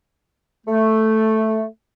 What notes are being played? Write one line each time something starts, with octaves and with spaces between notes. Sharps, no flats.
A3